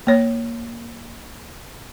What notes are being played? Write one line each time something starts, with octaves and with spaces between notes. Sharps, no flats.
A#3 C#5